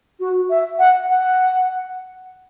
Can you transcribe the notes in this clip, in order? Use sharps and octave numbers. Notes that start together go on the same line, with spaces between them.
F#4
E5
F#5
F#5